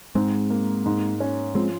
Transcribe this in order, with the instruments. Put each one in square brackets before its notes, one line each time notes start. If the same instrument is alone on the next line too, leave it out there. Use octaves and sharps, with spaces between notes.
[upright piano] G#2 [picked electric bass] G#3 C4
[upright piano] A#3
G#2
C#4
[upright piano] F3 [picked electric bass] G#3 C4